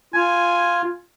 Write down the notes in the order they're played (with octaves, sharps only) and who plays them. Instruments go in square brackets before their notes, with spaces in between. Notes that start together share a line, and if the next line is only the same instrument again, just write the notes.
[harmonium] F4 [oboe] G#5